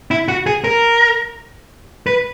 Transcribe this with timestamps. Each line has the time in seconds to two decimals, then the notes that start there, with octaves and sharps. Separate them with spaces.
0.11 E4
0.28 F#4
0.46 G#4
0.64 A#4
2.07 B4